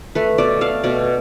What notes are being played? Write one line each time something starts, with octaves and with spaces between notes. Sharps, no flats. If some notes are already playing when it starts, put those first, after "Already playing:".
A3 B4
B2 D5
A3 F5
B2 D5